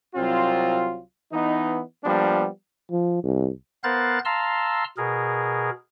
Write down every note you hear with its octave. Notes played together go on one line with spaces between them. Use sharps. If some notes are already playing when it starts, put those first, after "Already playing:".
C2 F#3 C4 F4
E3 B3 D#4
F3 G3 A#3 B3 D4
F3
C2
B3 A#4 C5 F5 F#6 A6
F5 A5 A#5 C6 E6 F6
B2 G#4 A#4